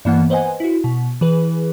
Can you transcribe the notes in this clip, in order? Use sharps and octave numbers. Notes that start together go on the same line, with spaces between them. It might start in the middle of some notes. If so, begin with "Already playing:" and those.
G2 E3 A#3 B3 F#5
B4 C5 D#5 F#5 G#5
E4 F#4
B2
E3 G#4 B4